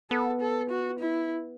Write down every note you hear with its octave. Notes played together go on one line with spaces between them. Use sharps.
B3 A4
A4
F#4
E4